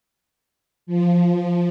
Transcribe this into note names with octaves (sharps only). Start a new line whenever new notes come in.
F3